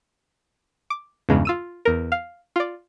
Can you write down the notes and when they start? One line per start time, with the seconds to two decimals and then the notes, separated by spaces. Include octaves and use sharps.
0.90 D6
1.29 E2 G2 C#3 G#3
1.45 F4 E6 D#7
1.85 E2 A#4
2.12 F5
2.56 F4 D5